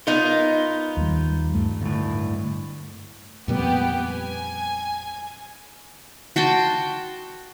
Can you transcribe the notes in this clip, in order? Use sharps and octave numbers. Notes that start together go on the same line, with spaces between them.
B3 D#4 F4 A#4
D#2 G3
G2 A3
D2 A2
F2 A#2 G3 B3 G4
G#5
F#4 G5 A5 C6